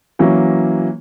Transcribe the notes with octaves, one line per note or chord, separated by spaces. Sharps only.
E3 F#3 A#3 C#4